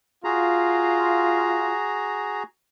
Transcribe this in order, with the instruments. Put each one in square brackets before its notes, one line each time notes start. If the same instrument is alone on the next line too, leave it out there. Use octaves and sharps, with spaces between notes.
[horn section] F4 [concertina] F#4 G#4 A#5